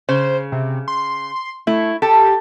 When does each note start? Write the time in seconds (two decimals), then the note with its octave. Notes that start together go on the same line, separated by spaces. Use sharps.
0.09 C#3 C5
0.52 C3
0.88 C6
1.67 A3 E4
2.02 G4 A4